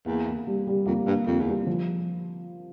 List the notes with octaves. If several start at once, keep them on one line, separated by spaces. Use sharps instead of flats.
E2 A#3
A#3
G3
G3
F2 A#3
G2 A#3
F2 A#3
E2
G3
F3